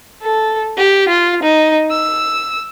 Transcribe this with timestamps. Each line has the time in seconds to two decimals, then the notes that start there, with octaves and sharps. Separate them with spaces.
0.22 A4
0.77 G4
1.08 F4
1.42 D#4
1.91 E6